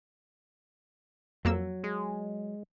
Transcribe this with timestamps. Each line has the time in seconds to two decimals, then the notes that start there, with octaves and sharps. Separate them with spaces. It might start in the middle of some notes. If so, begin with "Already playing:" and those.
1.45 F2 F#3 A#3 E6
1.84 G#3